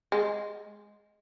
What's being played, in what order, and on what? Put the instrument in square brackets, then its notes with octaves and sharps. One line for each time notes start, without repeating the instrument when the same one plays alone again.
[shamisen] G#3